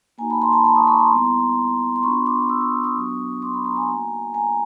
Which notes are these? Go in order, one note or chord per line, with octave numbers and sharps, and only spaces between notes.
A#3 D#4 F#4 G#5 A#5
A5 B5
A#5 C6
A5 B5
A5 B5
C#6 D#6
B5 C#6
A#5 C6
G3 B3 E4
C6
B3 D4 F4 B5 C#6
C6 D6
D6 E6
C#6 D#6
C#6 D#6
F#3 B3 D4 F#4
C6 D6
B5 C#6
A#5 C6
G#5 A#5
A#3 D#4 F#4
G#5 A#5